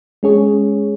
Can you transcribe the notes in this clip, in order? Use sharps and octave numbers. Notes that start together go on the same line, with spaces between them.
G#3 C#4 G#4 C#5